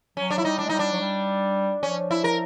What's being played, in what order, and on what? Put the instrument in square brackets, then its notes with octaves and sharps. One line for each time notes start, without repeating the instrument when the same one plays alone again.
[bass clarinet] F#3 [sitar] C#4
[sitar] D4
E4
[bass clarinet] G3 [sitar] D#4
[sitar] D4
[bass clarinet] G#3
[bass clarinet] G3 [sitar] D#4
[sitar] D4
[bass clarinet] F#3
G3
[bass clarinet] F3 [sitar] C#4
[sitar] E4
A#4